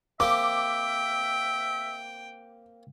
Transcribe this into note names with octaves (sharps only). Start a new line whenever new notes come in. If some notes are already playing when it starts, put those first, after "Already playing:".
A#3 C4 G4 E5 G5 D6